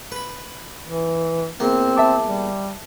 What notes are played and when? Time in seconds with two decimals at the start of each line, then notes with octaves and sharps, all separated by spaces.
0.12 B4 B5
0.86 E3
1.60 E2 A#3 C4
1.96 E5 A5 D6
2.26 G3